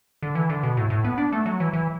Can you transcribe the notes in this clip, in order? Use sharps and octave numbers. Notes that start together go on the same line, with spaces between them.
D3
E3
D3
B2
A2
A2
B3
D4
A3
F#3
E3
E3